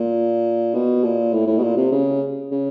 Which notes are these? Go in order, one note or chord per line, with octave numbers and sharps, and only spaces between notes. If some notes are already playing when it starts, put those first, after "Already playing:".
Already playing: A#2
B2
A#2
A2
A2
B2
A#2
C3
C#3
C#3